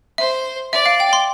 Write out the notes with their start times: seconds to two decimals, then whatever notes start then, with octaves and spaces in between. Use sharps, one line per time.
0.18 C5 E5
0.73 D5 E5
0.86 F5
1.00 G5
1.13 C6